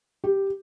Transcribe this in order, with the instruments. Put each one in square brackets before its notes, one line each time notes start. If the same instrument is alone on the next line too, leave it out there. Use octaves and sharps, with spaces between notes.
[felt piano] G4